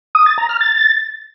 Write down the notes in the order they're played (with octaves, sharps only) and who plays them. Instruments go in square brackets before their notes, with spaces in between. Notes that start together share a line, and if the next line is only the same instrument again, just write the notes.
[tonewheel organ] D#6
A6
A#5
F6
A6